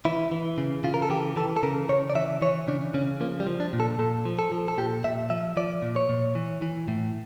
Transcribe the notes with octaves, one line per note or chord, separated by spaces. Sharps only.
E3 E4
E3
C#3
C#3 F4
A#4
A4
E3 G4
E3 A4
A4
C#3 A#4
C#3 C#5
D5
E3 E5
E3 C#5
C#3 D4
C#3 C#4
F3 A#3
G3
F3
D4
A#2
A4
A#2 A4
F3
A4
F3
A4
A#2 G4
A#2 E5
F3 E5
F3 D5
A#2
C#5
A#2
E3
E3
A2